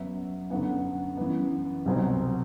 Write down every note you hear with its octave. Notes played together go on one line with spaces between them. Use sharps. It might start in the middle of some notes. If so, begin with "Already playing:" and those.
Already playing: F#2 F#3 B3 E5
F#2 D3 F#3 B3 F#5
F#2 E3 B3
C2 B2 F#3 C4